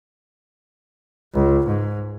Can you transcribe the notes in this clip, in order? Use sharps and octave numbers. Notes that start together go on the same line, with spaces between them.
C#2
G#2